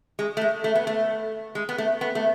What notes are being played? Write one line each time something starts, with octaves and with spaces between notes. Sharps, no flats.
G#3
A3
G#3
A3
B3
A3
G#3
B3
A3
B3
A3